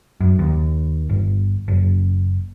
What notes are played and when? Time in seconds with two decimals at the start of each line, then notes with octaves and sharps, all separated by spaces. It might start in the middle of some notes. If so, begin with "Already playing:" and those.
0.20 F#2
0.39 D#2
1.09 G1
1.68 F#1